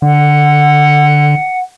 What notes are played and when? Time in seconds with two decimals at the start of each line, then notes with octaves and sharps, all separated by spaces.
0.02 D3 F#5